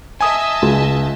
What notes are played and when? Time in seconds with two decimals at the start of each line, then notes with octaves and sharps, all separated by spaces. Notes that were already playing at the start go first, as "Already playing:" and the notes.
0.21 D#5 E5 G#5 A5 D#6
0.62 C#2